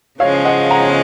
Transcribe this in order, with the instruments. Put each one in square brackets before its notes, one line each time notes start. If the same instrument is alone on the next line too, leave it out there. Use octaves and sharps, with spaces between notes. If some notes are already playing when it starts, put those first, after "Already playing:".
[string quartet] C#3 F3 G#3 C#4 [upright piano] C#5 F5
[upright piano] D#5 F#5
F#5 A#5